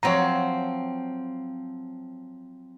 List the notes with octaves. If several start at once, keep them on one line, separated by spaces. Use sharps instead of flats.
F3 F#3 C4 C#5 A#5